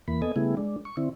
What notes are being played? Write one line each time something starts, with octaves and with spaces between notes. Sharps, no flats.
E2 E3 A#3 B5
B3 A4 D#5 G#5
C#3 G3 A3 B3 E4 G#4
G#3 D4
C#6
D3 C4 E4